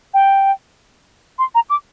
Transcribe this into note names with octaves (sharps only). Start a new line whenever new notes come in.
G5
C6
A#5
D6